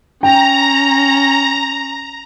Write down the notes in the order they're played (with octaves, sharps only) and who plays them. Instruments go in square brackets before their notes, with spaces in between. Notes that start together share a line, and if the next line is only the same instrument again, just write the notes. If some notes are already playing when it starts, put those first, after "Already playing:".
[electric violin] C#4 [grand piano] G5 [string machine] A#5